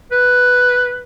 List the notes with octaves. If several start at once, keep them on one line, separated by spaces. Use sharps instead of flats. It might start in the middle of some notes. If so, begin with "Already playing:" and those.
B4